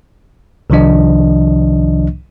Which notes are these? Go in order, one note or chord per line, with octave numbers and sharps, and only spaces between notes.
C2 C3 D#3 F3 D4 D#5